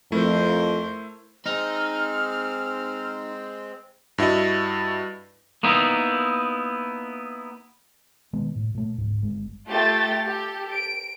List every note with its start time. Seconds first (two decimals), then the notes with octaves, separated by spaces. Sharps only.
0.12 F2 A3 E4 A#4 C5
1.46 G#3 C4 D#4 F6
4.18 G2 E4 F#4 D#5
5.63 A#3 B3 D#4 E4
8.33 B2 D#3 G#3 B3
8.56 A2
8.75 A#2 A3
8.98 D1 G#2
9.22 G1 G#3
9.68 A3 F4 G4 G5 A6
10.25 G4 A4
10.73 D7